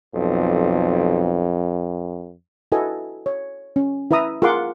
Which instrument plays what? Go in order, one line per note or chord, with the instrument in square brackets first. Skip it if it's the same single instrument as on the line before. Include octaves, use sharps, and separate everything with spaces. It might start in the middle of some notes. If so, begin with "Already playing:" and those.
[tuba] B1 [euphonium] F2
[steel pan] E4 F#4 A4 B4 D#5 G#5
C#5
C#4
E4 B4 E5 A#5 D#6
F4 G#4 A#4 F#5 C6 D6